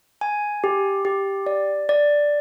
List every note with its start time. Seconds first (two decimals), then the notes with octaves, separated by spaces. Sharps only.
0.21 G#5
0.64 G4
1.05 G4
1.46 D5
1.89 D5